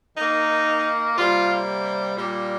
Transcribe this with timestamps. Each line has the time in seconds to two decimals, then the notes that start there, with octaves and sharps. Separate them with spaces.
0.17 D#3 A#3 D#4
1.17 C3 G3 A#3 F4
2.16 A#2 G3 A#3